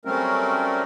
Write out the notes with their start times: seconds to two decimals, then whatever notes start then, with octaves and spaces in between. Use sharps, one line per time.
0.05 F#3 G3 A3 C4 C#4 A#4